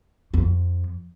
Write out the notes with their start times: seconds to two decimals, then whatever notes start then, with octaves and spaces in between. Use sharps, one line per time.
0.34 F2